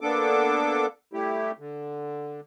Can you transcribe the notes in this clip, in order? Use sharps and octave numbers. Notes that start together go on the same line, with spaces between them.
A#3 B3 D4 A4 D6
G3 A3 E4 G4
D3